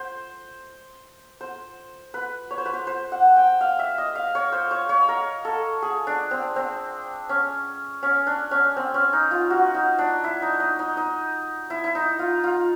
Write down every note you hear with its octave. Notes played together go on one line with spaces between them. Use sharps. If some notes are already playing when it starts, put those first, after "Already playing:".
Already playing: C5
C5
B4
C#5
C5
B4
C5
C5
F#5
G5
F5
E5
D#5
F5
C#5
C5
C#5
C#5
A#4
A4
G#4
D4
C4
C4
C#4
C#4
D4
C#4
C4
C#4
D#4
F4
F#4
D#4
D4
E4
D#4
D#4
D#4
D#4
E4
E4
D#4
F4
F4